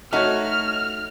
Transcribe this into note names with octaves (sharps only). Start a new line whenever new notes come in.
A3 D#4 F#4 C#5 F6